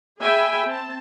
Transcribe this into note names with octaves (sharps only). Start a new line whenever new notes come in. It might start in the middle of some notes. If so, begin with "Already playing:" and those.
G#4 E5 G5 G#5 B5
C4 A5